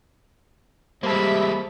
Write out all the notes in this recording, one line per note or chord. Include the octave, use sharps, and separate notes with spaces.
G3 G#3 A#3 C5 E5 A5 B5